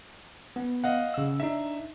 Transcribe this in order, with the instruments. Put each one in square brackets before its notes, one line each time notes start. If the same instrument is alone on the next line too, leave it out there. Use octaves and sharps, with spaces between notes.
[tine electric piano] B3
[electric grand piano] D#5 F5 F#5
[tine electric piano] C#3 E6
[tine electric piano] D4 D#4 [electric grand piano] E5